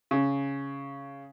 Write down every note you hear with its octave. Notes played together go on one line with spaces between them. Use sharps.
C#3